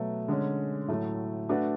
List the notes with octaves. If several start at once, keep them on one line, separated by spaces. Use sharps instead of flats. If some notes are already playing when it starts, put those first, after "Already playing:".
Already playing: B2 F#3 A3
D3 G#3 C#4
A2 F#3 A3
A3 D4 F#4 B4